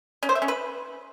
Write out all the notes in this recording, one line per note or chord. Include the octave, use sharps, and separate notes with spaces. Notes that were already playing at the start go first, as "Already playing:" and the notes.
C#4
C5
E5
C#4
B4